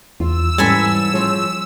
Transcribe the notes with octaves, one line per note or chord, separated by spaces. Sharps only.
E2 F4 E6
G#2 E3 G3 C#4 A4 G#5 B5
F3 G#4 C#5